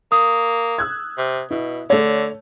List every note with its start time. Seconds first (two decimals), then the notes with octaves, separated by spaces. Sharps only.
0.12 A#3 D#6
0.78 E6 F#6 G#6
1.18 C3
1.51 B2 E4
1.90 D3 A3 C#5